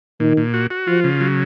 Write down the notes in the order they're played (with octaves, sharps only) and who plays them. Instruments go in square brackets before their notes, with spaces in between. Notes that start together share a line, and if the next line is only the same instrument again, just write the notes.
[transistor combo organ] A#2 [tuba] D#3
[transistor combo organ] A#2
F#4
F#4
[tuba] F3 [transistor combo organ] F4
[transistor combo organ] C#3
F#3